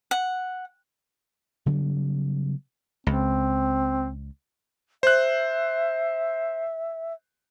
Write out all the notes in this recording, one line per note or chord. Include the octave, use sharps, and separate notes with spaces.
F#5
C#3 F#3 G3 B3
C#2 C4
C5 E5 F#6